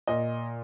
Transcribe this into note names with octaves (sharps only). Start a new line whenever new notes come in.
A#2 D#5